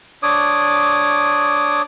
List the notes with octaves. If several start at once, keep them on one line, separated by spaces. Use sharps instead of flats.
D4 C#5 D6 D#6